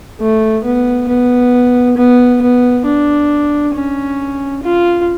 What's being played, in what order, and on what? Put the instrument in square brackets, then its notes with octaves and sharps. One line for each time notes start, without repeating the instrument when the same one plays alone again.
[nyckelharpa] A3
B3
B3
B3
B3
D4
C#4
F4